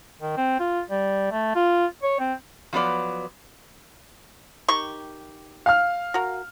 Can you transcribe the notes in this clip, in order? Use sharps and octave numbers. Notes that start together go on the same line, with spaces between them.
D#3
C4
F4
G3
A3
F4
C#5
C4
F3 F#3 B3 B4 D5
D#3 G4 C#6
F5 F6
F#4 A#4